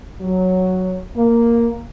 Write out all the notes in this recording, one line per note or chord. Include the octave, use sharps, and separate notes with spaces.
F#3
A#3